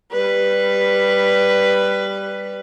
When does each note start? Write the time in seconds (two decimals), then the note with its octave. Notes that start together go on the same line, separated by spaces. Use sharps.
0.12 G3 B4